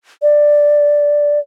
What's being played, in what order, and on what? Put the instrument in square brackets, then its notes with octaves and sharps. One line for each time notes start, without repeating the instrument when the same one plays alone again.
[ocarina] D5